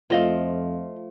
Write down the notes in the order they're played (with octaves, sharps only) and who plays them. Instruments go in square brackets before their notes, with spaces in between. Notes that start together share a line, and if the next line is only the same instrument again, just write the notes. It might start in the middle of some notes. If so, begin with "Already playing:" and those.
[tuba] F2 [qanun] F3 A3 [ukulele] F4 D#5 F5